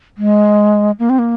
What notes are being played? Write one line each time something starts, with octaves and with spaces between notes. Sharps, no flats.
G#3
A#3
C4
A#3